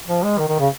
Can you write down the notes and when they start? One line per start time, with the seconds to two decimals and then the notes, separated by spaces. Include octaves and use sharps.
0.08 F3
0.23 G#3
0.38 D#3
0.49 D#3
0.59 C#3